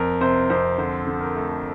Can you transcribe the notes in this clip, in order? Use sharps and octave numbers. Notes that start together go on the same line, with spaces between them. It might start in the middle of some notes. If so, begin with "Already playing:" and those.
Already playing: F2 A#4
C3 C5
F2 C5
D3 C5
D3
A#4
A3